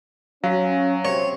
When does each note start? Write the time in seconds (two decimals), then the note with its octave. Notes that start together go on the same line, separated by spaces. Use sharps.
0.44 F#3 C#4 F#4 F5
1.05 C3 C4 C#5